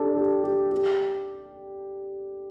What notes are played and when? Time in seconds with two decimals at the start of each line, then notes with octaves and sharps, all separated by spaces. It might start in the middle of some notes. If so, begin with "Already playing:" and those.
Already playing: D4 G4 A4
0.17 G4
0.44 G4
0.72 G4